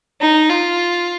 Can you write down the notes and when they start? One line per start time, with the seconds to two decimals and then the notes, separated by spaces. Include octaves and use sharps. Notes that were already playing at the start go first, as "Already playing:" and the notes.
0.21 D#4
0.50 F4